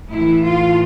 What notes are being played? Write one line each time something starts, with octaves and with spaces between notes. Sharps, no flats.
A2 E4
E3
F4